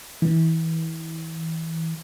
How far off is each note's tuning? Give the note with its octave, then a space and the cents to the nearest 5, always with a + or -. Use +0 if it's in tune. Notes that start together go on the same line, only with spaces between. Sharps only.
E3 -25